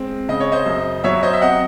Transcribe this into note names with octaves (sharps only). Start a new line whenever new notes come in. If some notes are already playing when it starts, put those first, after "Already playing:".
Already playing: G#3 C4
C#3 D#5
C#5
C5 D#5
F#2
F#3 C#5 E5
C5 D#5
E5
C4 D#5 F#5